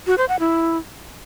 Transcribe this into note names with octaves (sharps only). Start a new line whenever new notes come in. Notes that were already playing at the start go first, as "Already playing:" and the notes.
F#4
C5
F#5
E4